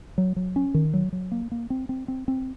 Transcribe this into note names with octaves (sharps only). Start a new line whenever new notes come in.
F#3
F#3
C#4
D#3
F#3
F#3
A#3
A#3
C4
C4
C4
C4